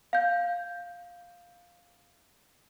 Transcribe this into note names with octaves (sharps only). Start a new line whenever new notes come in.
F5 G6